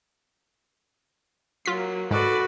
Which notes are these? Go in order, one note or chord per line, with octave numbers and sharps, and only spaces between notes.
F#3 A#3 F4 B6
G#2 F#4 A4 B4 D5